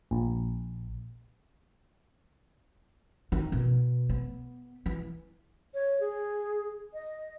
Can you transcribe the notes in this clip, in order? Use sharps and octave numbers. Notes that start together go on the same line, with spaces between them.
A#1
D#3
B2
B3
E3
C#5
G#4
D#5